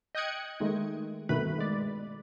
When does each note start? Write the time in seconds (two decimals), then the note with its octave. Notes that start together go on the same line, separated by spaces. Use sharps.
0.15 D#5 G5 D#6 F#6 G#6 C#7
0.60 D#3 G#3 A3
1.29 G2 B2 D#3 A3 B4 B5
1.58 G#3 D5